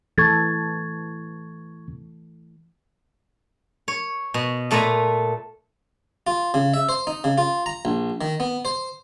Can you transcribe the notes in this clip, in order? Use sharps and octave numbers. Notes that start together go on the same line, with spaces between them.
E3 A3 A4 C#6 G#6 A6
C#5
B2
A#2 A3 B4 G#5 A#5
F4
C#3
E5
C5
D#4
C#3
F4
A#5
A#1
D#3
B3
C5